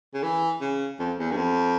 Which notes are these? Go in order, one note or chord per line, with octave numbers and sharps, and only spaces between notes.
C#3
E3
C#3
F2
E2
G2
F2